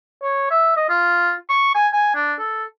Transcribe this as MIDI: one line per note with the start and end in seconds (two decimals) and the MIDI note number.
0.23 0.48 73
0.51 0.73 76
0.76 0.88 75
0.89 1.33 65
1.50 1.72 85
1.75 1.88 80
1.93 2.11 80
2.15 2.34 62
2.39 2.64 69